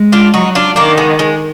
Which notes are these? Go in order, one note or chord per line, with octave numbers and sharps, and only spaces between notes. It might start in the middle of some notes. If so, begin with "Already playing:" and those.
Already playing: G#3
D4 F4
F#3 D#4 F#4
D4 F4
D#3 A#3 D4
G#3 B3
G#3